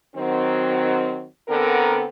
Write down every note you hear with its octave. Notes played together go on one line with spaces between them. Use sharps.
D#3 F#3 C4
D3 B3 C4 A4 A#4